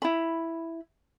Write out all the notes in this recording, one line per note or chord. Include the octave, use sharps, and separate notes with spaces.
E4 B5